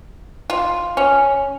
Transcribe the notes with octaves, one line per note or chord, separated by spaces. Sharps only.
F4
C#4